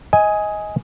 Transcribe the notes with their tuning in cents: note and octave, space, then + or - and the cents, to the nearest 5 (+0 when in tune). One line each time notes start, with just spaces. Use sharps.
D#5 +20 G#5 +0